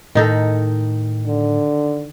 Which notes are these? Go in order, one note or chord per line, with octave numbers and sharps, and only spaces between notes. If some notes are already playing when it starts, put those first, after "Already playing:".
A2 D#3 D#4 A4
D3